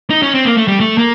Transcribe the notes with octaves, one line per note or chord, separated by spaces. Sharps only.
D#4
C#4
C4
A#3
A3
G3
A3
A#3